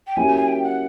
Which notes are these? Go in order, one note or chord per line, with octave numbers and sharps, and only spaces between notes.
G5
F#3 A#3 C#4 E4 G4 G#5
G#5
G5
F#5